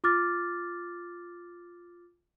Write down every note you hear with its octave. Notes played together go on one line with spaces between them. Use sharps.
F4 D6 F6 A6